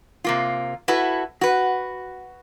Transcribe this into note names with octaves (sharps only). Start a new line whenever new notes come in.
C3 A#3 F4
E4 F#4 A4 B4
F#4 B4